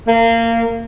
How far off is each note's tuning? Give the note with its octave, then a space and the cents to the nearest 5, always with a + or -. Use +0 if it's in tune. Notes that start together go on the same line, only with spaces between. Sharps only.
A#3 -25